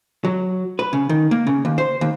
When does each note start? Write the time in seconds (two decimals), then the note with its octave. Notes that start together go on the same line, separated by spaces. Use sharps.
0.25 F#3
0.79 B4
0.93 C#3
1.09 D#3
1.31 A#3
1.47 C#3
1.65 D#2
1.78 C5
2.01 D#2